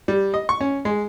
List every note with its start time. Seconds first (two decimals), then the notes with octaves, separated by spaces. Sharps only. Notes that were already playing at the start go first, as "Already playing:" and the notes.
0.08 G3
0.34 D#5
0.49 C#6
0.61 C#4
0.85 G#3